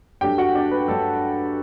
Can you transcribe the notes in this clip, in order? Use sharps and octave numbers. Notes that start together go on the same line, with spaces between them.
G2 F#3 A3 D4 G4 G5
F#4 F#5
D4 D5
B4
G2 F#3 A3 D4 A4 A5